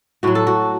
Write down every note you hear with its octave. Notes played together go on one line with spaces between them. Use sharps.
A2 F#3 F#4
A4
F#4